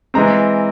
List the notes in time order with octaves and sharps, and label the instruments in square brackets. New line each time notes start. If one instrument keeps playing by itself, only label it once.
[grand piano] E3 G#3 C4 A#5